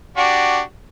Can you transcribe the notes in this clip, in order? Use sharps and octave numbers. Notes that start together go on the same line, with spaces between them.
D4 F#4 G4